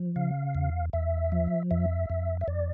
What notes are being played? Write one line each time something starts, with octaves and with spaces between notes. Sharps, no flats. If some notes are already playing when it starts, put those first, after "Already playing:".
Already playing: F3
C#3 F5
E2
E2 E5
F3
F2 E5
F2
E5
F2 D5